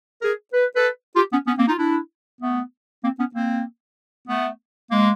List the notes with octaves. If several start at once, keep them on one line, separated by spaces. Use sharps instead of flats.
G#4 A#4
B4
A4 B4
F4 G4
B3 C#4
B3 C#4
A#3 C4
D#4 F4
D4 E4
A3 B3
A#3 C4
B3 C#4
A#3 C4
A3 B3
G#3 A#3